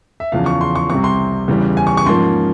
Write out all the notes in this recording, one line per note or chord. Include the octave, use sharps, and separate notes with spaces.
E5
E2 C#3 F3 F5
C#6
C6
C#6
C2 C3 G3 C4 C#6
C6
E2 C#3 E3 G3
G#5
C#6
C#6
G#2 F3 A#3 C#4 C6